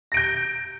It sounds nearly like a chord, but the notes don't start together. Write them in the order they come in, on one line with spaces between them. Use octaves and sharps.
A#6 D7 G6